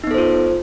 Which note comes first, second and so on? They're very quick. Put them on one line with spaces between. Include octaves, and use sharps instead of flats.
D#4 B3 A4 C5 F4